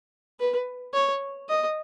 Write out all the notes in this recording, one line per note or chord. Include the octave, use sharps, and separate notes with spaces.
B4
C#5
D#5